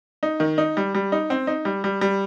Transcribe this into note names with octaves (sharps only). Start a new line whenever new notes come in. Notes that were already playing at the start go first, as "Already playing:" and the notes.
D#4
D#3
D#4
G3
G3
D#4
C4
D#4
G3
G3
G3